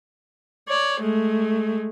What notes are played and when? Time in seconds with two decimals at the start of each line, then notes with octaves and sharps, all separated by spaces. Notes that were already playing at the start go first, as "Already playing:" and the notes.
0.68 C#5 D5
1.01 G#3 A3